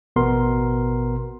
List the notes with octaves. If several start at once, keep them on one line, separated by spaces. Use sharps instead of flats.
A1 B2 B3 A#4 C6